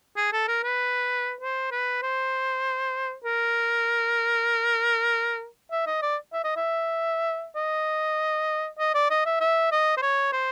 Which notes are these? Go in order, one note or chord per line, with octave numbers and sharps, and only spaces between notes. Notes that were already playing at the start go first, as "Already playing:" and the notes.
G#4
A4
A#4
B4
C5
B4
C5
A#4
E5
D#5
D5
E5
D#5
E5
D#5
D#5
D5
D#5
E5
E5
D#5
C5
C#5
C5